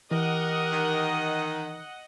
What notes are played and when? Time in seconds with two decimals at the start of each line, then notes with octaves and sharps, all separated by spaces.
0.11 E3 G4 A#4 D#5 F#5
0.72 D#3